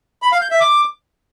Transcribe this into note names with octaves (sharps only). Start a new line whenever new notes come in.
B5
F5
G6
E5
D6